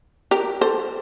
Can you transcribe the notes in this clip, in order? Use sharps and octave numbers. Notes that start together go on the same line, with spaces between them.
G4 A#4
A4 C5